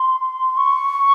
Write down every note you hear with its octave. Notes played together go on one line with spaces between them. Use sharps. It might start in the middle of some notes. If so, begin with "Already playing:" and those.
Already playing: C6
C#6